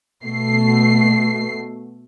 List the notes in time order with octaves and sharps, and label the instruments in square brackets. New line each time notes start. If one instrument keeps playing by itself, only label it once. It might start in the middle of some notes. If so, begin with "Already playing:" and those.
[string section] B2 A3 C7